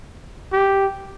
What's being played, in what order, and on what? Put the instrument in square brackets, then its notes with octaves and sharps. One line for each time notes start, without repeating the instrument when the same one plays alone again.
[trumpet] G4